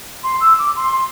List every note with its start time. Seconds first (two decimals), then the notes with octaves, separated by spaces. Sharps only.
0.23 C6
0.41 E6
0.59 D6
0.76 C6